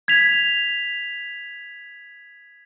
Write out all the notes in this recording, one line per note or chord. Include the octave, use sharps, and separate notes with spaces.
G#6 B6 F7